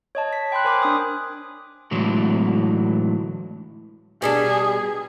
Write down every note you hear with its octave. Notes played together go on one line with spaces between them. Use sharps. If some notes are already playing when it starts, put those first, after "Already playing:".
C#5 D#5 A5
B6
G5 B5 C6 F#6
A#4 C5 G#5 C6 D6
D4 D#6
A2 D3 E3 F#3 G#3
B2 G3 D4 G#4